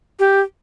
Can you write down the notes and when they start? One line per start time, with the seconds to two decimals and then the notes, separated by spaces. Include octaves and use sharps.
0.19 G4